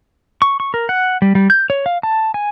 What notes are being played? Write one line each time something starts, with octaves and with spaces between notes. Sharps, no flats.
C#6
C#6
A#4
F#5
G3
G3
G6
C#5
F5
A5
G#5